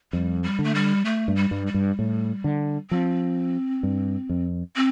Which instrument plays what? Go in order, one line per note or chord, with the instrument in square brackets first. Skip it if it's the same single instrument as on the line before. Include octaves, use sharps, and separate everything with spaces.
[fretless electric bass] F2 [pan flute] G3
[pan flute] G3
[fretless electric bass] D3
[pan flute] A3
G3
A3
[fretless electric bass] G2
[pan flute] G3
[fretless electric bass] G2
[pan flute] G3
[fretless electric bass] G2
A2
D3
[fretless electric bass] F3 [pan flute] C4
[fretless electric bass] G2
F2
[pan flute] C4